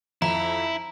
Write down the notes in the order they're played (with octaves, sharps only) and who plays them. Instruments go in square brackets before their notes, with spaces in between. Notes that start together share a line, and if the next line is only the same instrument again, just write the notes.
[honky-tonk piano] F2 [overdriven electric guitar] E4 [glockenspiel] A#5